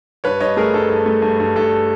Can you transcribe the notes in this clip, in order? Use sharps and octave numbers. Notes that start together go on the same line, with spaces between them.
G2 B4 C#5
G2 C#5 D#5
A3 G#4 A#4
G2 A4
G2 A4
A3
G2
G2
G2 A4